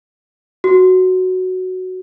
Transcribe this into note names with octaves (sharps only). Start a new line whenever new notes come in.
F#4